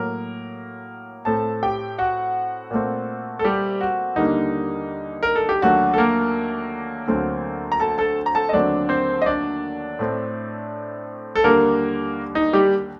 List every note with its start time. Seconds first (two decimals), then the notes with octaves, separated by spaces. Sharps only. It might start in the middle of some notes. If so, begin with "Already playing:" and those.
Already playing: A2 F#3 A#3 A#4
1.25 A2 A3 C4 A4 A5
1.63 G4 G5
1.99 F#4 F#5
2.71 A#2 A3 C4
3.39 A4
3.44 G3 G4
3.81 F#4
4.16 D#2 D3 G3 A#3 D#4
5.23 A#4
5.35 A4
5.49 G4
5.62 D#2 D3 F#3 A3 F#4
5.94 A4
5.98 A#3 A#4
7.07 D2 D3 F#3 A3 C4
7.72 A#5
7.80 A4 A5
7.98 A4 A5
8.26 A#5
8.35 A4 A5
8.49 D#5
8.53 D#2 D3 F#3 A3 C4 D4 D5
8.89 C4 C5
9.22 D#5
9.26 D4 D5
9.99 A2 A3 C4
11.35 A4
11.44 D#2 D3 G3 A#3 A#4
12.35 D#4
12.53 G3 G4